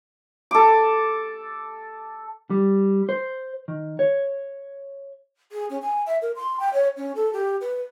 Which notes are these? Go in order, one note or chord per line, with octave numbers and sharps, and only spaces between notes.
A4 D6
G3
C5
D#3
C#5
G#4
C#4
G#5
E5
A#4
C6
G5
C#5
C#4
A4
G4
B4